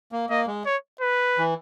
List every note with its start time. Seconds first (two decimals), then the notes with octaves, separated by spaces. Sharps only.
0.12 A#3
0.30 A#3 D#5
0.47 G#3
0.66 C#5
1.01 B4
1.38 E3